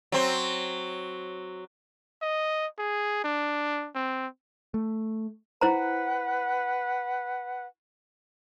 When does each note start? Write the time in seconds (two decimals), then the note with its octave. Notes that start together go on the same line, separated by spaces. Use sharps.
0.12 F#3 C4
2.22 D#5
2.79 G#4
3.24 D4
3.95 C4
4.74 A3
5.61 E4 B4 C5 F#5 A#5